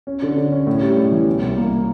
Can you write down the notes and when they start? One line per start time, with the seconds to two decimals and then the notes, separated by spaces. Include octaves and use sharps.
0.07 C#4
0.22 D3
0.37 D3
0.52 C#4
0.67 A2
0.82 G3
0.97 A2
1.12 E3
1.27 B2
1.41 C2
1.57 A#3